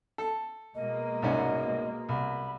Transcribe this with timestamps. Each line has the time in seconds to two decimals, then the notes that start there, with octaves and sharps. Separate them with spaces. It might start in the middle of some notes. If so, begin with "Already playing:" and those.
0.18 A4
0.75 B2 G#3 A#3 D#5
1.22 C2 G#2 C#4
2.09 C2 B5